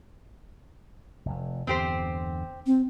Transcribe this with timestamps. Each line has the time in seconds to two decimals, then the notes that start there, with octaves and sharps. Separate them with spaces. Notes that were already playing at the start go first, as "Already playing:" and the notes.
1.26 F1 F2
1.67 E2 G2 D3 C4 G4 C5
2.67 C4